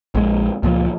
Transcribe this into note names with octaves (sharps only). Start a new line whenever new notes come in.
A#1 G#3
C#2 A#2 F3